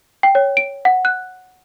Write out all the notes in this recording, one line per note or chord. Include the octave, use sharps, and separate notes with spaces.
G5
C#5
D7
F#5
F#6